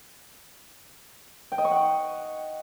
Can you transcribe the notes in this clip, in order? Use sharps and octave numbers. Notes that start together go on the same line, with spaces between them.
G5
D#5
C#6
F#5